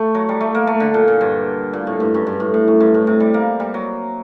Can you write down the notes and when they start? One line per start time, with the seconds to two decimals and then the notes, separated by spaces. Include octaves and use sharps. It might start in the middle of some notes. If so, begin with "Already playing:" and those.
Already playing: A3
0.15 F#3
0.29 G3
0.41 A3
0.55 A#3
0.67 A3
0.80 D3
0.94 A#2
1.08 A#2
1.21 G2
1.73 A#2
1.87 A2
2.00 G2
2.14 F#2
2.27 G2
2.40 A2
2.54 A2
2.68 F#2
2.80 G2
2.94 A2
3.07 C3
3.20 G3
3.34 A#3
3.60 G3
3.74 F#3